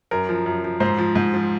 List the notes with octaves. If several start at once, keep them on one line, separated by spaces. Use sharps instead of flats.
F#2 A#4
F3
F#2
F3
G#2 C5
F3
G#2
F3